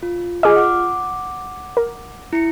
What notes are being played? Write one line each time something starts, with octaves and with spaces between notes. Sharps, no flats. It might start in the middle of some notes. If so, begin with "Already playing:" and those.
F4
F4 G#4 D#5 D6 F6
F#5 D6
A#4
E4 C#7